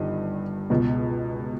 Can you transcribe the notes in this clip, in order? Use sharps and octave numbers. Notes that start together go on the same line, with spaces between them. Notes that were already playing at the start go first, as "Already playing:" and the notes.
Already playing: G1 G2 D#3 D#5
C#2 B2